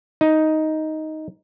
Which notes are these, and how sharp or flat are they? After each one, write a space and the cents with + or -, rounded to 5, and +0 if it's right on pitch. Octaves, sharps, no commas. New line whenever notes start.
D#4 +5